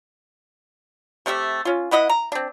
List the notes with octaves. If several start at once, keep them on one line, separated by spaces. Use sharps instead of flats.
C3 A3 G4 E5
C#4 F4
B3 E4 D#5 F#5
A#5
C4 D4